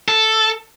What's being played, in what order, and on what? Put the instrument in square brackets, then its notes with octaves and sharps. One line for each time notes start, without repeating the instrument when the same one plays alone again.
[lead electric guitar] A4